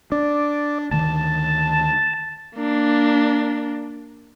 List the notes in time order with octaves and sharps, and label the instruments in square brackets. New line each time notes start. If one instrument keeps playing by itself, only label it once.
[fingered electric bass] D4 [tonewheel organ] D5
[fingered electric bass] D2 D#3 [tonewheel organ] A5
[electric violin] A#3 D4